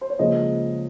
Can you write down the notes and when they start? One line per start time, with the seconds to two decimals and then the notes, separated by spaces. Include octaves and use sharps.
0.01 C5
0.10 C#5
0.19 C#2 C#3 F3 A#3 D#5